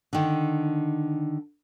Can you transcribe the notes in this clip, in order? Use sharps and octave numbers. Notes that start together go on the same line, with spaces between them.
D3 D#3